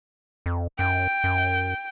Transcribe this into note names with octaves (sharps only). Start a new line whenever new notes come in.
F2
F#2 G5
F#2